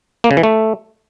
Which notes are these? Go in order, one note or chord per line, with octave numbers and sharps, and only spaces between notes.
A#3
C#3
E3
A3